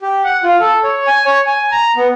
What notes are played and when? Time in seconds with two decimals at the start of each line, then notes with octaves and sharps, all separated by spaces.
0.02 G4
0.24 F#5
0.43 F4
0.60 A4
0.83 C#5
1.07 G#5
1.26 C#5
1.46 G#5
1.72 A#5
1.96 B3